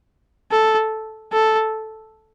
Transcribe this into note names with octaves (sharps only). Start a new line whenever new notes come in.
A4
A4